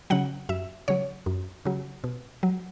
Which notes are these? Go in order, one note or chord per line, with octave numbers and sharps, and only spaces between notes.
C#3 F#3 F#5
F#2 E5
C#3 F#3 C#5
F#2
C#3 F#3
B2
F#3